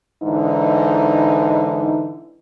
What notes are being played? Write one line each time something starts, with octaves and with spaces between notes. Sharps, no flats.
G#2 D3 E3 D#4